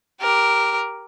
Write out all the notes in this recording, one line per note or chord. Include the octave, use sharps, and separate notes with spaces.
G4 A#4